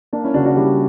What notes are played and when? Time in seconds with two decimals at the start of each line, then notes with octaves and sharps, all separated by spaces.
0.13 A#3 D4
0.24 C#4 E4
0.34 C#3 D4 F#4
0.45 D4 F#4
0.56 G3 E4 G4